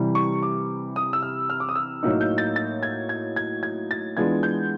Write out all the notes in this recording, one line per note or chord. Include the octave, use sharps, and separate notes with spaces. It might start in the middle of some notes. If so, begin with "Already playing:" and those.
Already playing: C3 E3 G3
C#6
D6
D#6
E6
F6
F6
D6
D#6
E6
A2 F#3 A#3 D#4
G6
A6
A6
G#6
G#6
G#6
G#6
A6
E3 G#3 B3 D4 F4 G#6
G6